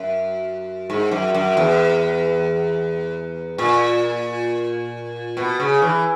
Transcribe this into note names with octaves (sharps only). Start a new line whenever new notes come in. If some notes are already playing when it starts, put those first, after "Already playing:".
Already playing: F#2
G#2
F#2
F#2
E2
A#2
B2
C#3
E3